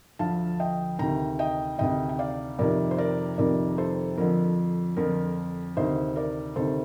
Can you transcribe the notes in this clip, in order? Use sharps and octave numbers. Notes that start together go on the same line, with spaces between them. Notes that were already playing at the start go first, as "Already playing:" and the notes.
D2 D3 F3 F5 A5
D#5 G5
D2 C3 D#3 G5 A#5
D#5 G5
D2 C3 D#3 D#5 G5
G5
D5 F5
F2 C3 D#3 A#4 D5
C5
A#4 D5
F2 C3 D#3 A#4 D5
A4 C5
F2 D3 F3 A#4
F2 D3 F3 A#4
D2 C3 D#3 C5 D#5
A#4 D5
D2 C3 D#3 A4 C5